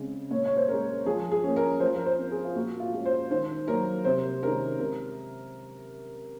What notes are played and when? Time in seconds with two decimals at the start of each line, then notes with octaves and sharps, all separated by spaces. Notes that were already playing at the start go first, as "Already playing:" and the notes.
Already playing: C#3 G#3 C4
0.31 A#2 C#5
0.45 C#5
0.57 C5
0.68 G#3 C#4 A#4
1.06 F3 G#4
1.31 G#4
1.43 A#3 C#4
1.56 A#4
1.80 F3 C5
1.96 A#4
2.06 C5
2.19 C4
2.31 G#4
2.44 F4
2.55 A#2 F#4
2.80 F4
2.93 G#3 C#4
3.06 C5
3.31 D#3 C5
3.67 F#3 A#3 A#4
4.04 C3 C5
4.42 D#3 G#3 C#4 A#4
4.79 C3 A#4